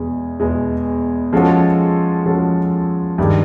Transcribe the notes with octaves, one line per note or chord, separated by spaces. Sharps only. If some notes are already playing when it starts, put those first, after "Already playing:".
Already playing: E2 B2 G#3
E2 B2 G#3
F3 G#3 C#4 F#4 A4
F3 G#3 C#4 F#4 A4
G2 D#3 G#3